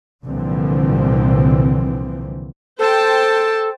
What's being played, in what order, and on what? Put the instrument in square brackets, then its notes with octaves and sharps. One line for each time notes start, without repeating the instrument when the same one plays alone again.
[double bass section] C2 A#2 D3 E3 F3 C4
[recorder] A4 [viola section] C5 G5 A5